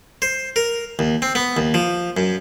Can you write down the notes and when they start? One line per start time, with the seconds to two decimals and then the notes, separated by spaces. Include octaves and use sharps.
0.22 C5
0.56 A#4
0.99 D#2
1.22 C4
1.35 B3
1.57 D#2
1.74 F3
2.17 F#2